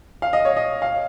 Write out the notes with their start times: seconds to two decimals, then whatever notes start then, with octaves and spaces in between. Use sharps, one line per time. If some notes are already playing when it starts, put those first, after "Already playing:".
0.22 F5
0.33 D#5
0.45 C#5
0.57 D#5
0.82 F5